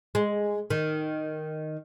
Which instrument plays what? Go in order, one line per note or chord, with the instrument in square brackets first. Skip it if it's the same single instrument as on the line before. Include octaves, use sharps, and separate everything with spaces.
[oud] G#3
D#3